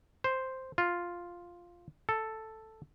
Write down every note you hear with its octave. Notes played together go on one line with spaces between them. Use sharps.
C5
F4
A4